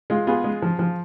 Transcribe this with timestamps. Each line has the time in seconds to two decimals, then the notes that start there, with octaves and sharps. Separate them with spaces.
0.10 G#3 F4
0.27 B3 F4 G#4
0.44 G#3
0.62 F3
0.79 F3